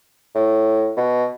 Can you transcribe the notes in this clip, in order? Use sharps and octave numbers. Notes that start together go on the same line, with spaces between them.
A2
B2